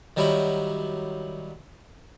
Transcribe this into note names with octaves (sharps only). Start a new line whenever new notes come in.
D#3 F#3 G3 E4